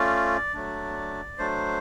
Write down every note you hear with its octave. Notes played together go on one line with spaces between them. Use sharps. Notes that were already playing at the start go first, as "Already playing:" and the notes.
Already playing: A3 C#4 F4 D5
F#3 A3 D4
F#3 A3 D4 C5